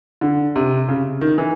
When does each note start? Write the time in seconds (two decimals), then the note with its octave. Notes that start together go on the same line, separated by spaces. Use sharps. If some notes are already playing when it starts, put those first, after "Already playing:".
0.21 D3
0.56 C3
0.88 C#3
1.21 D#3
1.38 E3